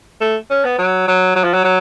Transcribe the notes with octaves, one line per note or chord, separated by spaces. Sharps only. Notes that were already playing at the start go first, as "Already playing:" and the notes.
A3
C#4
B3
F#3
F#3
F#3
F3
F#3
F#3